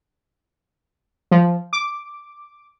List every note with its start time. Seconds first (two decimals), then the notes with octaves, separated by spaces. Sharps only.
1.31 F3
1.73 D6